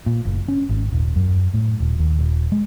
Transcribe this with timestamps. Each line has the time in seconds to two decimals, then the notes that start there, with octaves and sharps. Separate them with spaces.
0.06 A#2
0.25 F#1
0.48 C#4
0.69 G#1
0.92 D#1
1.16 F#2
1.54 A2
1.80 D#1
1.99 D#2
2.19 D#1
2.52 G#3